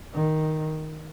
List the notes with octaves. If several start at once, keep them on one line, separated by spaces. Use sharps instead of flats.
D#3